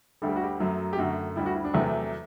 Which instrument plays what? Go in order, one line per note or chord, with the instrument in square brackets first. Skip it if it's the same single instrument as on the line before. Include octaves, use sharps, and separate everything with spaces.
[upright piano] D2 D3 G3 A4
G4
F#4
G4
F#2 F#3 A3
G4
F#2 D3 A3 F#4
D2 D3 G3 E4
F#4
E4
D4
E2 C3 F#3 A3